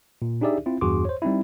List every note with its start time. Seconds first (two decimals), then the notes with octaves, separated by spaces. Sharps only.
0.22 A#2
0.41 D4 D#4 G4 G#4 D5 E5
0.66 C4 E4 F4
0.81 E2 G2 F#4 G#4 C6 D6
1.05 C5 C#5
1.22 G3 C4 D#4 E4